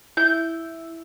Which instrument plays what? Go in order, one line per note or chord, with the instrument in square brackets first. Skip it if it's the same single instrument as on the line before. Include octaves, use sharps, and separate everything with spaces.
[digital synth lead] E4 [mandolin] G6